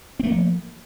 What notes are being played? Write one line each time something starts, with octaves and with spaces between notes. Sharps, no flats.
F3 A3 A#3 C4